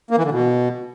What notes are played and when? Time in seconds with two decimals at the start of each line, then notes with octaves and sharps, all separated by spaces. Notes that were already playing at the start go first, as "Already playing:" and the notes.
0.11 A#3
0.18 E3
0.24 D3
0.31 B2